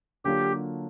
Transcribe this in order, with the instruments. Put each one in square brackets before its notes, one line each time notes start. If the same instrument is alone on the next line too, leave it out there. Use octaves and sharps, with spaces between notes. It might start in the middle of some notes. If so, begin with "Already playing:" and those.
[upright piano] D3 F#3 A#3 D4 F4 [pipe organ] G4